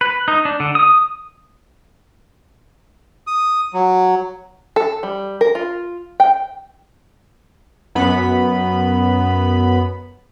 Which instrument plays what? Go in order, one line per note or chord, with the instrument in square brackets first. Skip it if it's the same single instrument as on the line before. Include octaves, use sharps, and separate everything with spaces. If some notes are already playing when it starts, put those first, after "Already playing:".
[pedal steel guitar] B4
D#4
D4
D3
D#6
[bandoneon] D#6
F#3
[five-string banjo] A4
G3
A#4
F4
G5
[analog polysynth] F#2 B3 B5